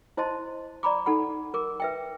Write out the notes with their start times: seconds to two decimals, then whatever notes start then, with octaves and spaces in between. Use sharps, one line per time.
0.17 E4 C5 D#5 A5 C6
0.83 D5 A#5 B5 D6
1.06 D#4 A4 F#5 B5
1.54 A#4 D6
1.80 B4 E5 G5